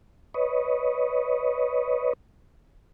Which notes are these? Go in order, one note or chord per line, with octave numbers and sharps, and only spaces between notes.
B4 C#5 D#5